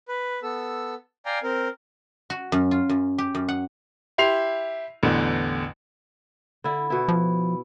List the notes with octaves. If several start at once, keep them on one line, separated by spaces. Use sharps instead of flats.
B4
B3 A4 E6
D5 F5 G5 G#5 A#5
C4 A#4
F#4
F#2
F4
F#2
G4
F#2
F#5
E4 G4 C6 C7 F7
A1 E2 D3
D3 E4 B5
B2 E4
F3